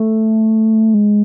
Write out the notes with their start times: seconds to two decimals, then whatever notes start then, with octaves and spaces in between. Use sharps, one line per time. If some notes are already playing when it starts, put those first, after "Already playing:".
Already playing: A3
0.94 G#3